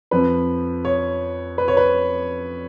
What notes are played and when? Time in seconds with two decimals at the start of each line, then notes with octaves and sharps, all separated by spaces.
0.11 F2 F3 B4
0.85 C#5
1.58 B4
1.68 C#5
1.77 B4